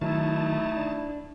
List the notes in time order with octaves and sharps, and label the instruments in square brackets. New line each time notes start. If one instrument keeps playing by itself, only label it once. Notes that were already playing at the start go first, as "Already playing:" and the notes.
[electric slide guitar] D#3 F#3 [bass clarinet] A3 [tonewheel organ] D#4 A5 [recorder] E4
[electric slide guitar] D4